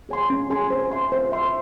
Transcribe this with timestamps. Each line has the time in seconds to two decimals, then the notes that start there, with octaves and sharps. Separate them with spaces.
0.09 G#4 C#5 G#5 C6
0.30 C#4
0.50 G#4 C#5 G#5 C6
0.70 C5
0.91 E5 C6
1.12 C5
1.32 E5 C6